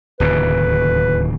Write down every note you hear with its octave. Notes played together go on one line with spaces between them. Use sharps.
D1 D#2 C#3 B4